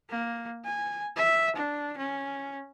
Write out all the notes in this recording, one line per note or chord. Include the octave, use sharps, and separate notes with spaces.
A#3
G#5
E5
D4
C#4